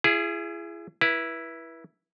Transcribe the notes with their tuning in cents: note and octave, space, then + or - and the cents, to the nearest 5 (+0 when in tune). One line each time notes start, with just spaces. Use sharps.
E4 +40 G#4 +0
E4 +5 B4 -30